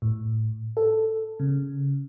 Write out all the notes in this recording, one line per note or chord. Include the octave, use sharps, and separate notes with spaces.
A2
A4
C#3